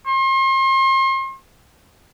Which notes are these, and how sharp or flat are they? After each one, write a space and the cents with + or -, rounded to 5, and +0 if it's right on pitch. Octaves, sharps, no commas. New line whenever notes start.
C6 +40